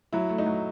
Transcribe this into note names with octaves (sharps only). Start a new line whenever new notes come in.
F#3 E4
A3
D#4
F#3